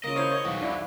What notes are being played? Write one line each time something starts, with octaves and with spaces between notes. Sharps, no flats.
C#3 A#3 F4 D#5
E4 A#4 C5 C#5 F5
C#5
B1 E2 E3 F#4 F5
D4 E4